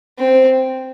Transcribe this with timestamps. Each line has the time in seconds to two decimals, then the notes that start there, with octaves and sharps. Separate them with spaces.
0.19 C4